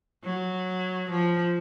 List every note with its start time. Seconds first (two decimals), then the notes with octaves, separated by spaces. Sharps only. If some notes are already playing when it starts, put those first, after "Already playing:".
0.24 F#3
1.11 F3